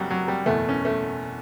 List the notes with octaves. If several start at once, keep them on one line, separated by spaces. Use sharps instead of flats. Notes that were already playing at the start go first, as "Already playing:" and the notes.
Already playing: F#1 F#2 F#3 G3
F#3
G3
F#1 E2 B2 A3
C#4
A3